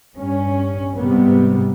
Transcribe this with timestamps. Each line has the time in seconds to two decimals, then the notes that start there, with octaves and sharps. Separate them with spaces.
0.15 G2 C#4
0.97 G#2 C3 G3 B3